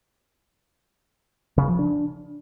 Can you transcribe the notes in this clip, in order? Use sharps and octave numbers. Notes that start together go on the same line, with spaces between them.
C#3
F3
D4